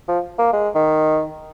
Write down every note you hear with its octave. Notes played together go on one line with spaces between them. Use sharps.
F3
A#3
G#3
D#3